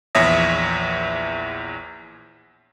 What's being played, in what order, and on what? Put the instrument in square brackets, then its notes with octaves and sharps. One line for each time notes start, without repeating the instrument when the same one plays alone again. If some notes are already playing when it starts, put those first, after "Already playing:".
[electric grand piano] A#1 E2 C#5 E5 D#6 A#6